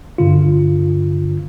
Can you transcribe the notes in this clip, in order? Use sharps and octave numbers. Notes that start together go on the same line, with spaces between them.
G2 D3 F4